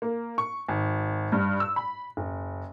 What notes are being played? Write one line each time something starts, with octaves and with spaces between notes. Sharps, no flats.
A#3
C#6
G#1
G2
E6
B5
F#1